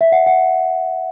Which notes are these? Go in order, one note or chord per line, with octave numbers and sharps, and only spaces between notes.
E5
F#5
F#5